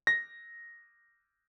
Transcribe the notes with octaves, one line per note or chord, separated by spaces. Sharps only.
A#6